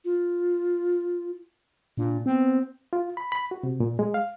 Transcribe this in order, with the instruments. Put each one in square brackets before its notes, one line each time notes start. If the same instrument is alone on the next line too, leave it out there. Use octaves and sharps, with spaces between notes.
[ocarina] F4
[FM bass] A#2 [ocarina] D4
[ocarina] B3 [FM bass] C4
[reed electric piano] F4
B5
B5
F#4
C3
A#2
G#3
F5